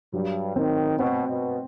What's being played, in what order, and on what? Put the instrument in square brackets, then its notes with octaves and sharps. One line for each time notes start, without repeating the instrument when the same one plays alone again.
[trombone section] G2 [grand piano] F#3
[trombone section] D#3 [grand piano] C4
[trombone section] B2 [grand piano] C4
[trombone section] B2